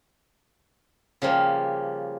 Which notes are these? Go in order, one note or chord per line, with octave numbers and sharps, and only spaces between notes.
C#3 F3 G3 A#3